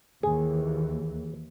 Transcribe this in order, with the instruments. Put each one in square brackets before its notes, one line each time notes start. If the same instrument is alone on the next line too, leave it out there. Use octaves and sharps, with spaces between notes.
[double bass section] D#2 E3 [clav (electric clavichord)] G#4